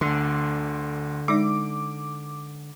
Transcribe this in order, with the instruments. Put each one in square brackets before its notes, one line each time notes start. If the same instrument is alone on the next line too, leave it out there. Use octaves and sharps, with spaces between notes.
[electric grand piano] D2 C6 [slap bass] D3
[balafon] G#3 D#4 D5 [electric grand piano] D6